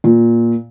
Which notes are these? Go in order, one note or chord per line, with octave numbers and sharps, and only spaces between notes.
A#2